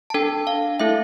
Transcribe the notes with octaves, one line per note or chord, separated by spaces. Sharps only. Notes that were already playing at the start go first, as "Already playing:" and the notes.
A5
D4 A4 G5
F5
A3 E4 A4 E5